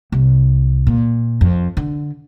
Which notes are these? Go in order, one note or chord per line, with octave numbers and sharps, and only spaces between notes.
C2
A#2
F2
D3